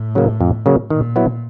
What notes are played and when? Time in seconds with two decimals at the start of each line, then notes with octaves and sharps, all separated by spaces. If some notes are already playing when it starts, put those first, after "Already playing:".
Already playing: A2
0.15 C#3 F#3 A#3
0.41 F2
0.66 C#3 F#3 A#3
0.90 A#2 D#3
1.16 F#3 B3 E4